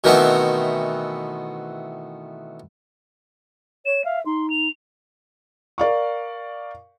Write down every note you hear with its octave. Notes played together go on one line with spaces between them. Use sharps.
B2 D#3 E3 A3 B3 C4
C#5 E7
E5 F5
D#4 C6
F7
A#4 D5 F5 C#6